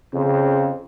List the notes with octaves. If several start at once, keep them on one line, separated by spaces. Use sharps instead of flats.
F2 C#3